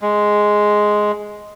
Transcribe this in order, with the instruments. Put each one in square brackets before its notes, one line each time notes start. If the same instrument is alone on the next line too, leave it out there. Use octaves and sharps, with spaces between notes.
[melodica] G#3